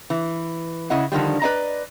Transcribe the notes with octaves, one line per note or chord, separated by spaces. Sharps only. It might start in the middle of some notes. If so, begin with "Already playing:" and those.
E3
C#3 E4 D#5 F#5
D3 D#3 F3 G3
B4 D5 D#5 A#5